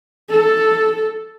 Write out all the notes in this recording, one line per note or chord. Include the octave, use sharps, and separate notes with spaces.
A4